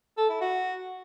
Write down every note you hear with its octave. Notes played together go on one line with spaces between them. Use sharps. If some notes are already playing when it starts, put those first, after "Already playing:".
A4
E4
F#4